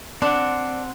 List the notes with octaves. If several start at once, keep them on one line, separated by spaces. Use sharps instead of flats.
C4 D4 F#5